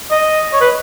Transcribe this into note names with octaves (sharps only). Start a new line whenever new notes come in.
D#5
C#5
B4